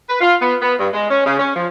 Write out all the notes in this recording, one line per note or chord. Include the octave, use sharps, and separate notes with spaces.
B4
F4
B3
B3
G2
G#3
C#4
C#3
C#4
F3